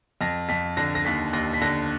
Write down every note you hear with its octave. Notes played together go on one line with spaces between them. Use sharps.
F2 A#6
F2 B6
D3 A#6
A#6
D#2 B6
D#2 A#6
B6
D3 A#6